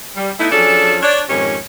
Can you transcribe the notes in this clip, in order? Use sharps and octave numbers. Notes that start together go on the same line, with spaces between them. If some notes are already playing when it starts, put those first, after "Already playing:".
G3
A3 B3 D#4 E4
F3 F#3 C#4 D4 G#4 A4
D4 C#5 D5
F2 G#2 D#3 C#4 G4 C#5